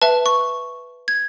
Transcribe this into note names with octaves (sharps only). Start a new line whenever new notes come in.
B4 E5 A5
C#6
G#6